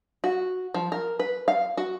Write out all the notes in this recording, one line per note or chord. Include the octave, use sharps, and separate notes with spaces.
F#4
F3
A#4
B4
F5
F#4